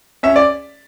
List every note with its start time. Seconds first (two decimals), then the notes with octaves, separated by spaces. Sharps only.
0.23 C#4 E5
0.36 D5